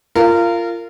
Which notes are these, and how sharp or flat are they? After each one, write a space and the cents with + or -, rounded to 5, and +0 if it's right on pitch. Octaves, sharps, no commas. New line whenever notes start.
F4 -20 A#4 -25